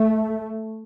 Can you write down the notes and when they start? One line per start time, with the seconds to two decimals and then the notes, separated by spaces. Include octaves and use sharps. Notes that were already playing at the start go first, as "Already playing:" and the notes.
Already playing: A3